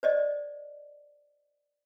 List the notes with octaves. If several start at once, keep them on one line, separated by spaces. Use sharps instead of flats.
C5 D5 D#5